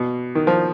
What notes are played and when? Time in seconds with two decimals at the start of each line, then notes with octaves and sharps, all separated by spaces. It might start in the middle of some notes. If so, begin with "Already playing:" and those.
Already playing: B2
0.35 D#3
0.47 F3